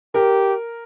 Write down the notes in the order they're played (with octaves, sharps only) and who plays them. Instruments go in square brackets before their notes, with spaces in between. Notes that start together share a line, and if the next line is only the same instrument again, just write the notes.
[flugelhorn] G4 [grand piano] A#4